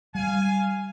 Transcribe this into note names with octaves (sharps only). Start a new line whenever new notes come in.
G3 F5 G#5